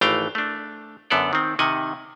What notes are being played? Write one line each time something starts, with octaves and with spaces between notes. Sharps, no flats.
G#1 E3 A3 F5 G5 A#5
A3 D4
F#2 D3 B3 A4 D5
D#3 C4
C3 D#3 D#5 F#5 G#5